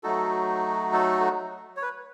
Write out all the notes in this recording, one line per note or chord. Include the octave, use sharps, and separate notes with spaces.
F#3 A3 D#4 F#4 A4
A4
C#5
B4